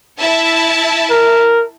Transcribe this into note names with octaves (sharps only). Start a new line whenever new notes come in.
E4 E5 A5
A#4